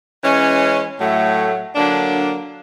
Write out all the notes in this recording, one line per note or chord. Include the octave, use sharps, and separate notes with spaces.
E3 G#3 C#4
A2 F#3 A3
D3 F#3 A#3 D4